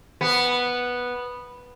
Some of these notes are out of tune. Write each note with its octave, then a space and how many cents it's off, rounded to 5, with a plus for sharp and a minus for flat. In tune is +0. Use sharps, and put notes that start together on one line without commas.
B3 -5